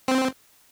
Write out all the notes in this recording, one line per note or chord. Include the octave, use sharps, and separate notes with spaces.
C4